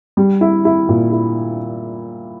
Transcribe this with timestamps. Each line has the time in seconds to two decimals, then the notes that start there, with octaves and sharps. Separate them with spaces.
0.17 G3
0.41 E4
0.65 E4
0.89 A#2
1.12 E4